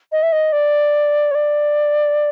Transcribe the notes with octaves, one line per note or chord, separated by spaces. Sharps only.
D#5
E5
D#5
D5
C#5
D5